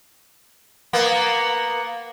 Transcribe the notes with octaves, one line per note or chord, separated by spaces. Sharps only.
A#3 B3